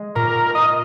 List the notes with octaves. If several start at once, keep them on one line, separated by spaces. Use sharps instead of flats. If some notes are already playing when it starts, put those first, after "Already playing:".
Already playing: G#3
A#2 A#4
F4 D#5